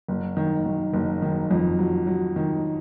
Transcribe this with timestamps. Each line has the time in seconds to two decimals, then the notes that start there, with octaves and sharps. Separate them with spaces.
0.08 F#1
0.37 D#3
0.66 D#3
0.93 F#1
1.22 D#3
1.51 F2
1.79 F#3
2.07 F#3
2.36 D#3